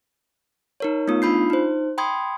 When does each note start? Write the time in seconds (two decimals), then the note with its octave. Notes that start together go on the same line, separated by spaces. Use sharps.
0.80 D#4 A#4 C#5
1.08 A3 B3 D#4 F4 D#6
1.22 D4 F4 B5 G6 C7
1.50 D#4 C5
1.98 G5 B5 C6 D#6 G#6